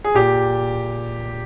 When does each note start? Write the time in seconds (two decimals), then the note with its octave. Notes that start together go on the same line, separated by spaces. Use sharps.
0.04 G#4
0.14 A#2 G4